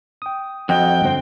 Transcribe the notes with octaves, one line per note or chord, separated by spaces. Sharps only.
G5 D#6
F2 F#4 D#5 F#5 G5
G2 D3 C4